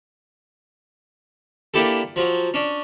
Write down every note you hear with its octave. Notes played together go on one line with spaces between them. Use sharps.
A#3 D4 E4 G4 A4
F3 F#3
C#4 D4